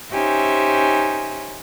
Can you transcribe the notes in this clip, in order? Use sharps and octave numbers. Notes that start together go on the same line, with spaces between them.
C#4 D#4 G4 C5 E5 G#5